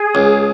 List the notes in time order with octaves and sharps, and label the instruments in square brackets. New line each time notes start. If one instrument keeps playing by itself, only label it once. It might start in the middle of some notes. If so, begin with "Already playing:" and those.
Already playing: [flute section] G#4
[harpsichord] C#2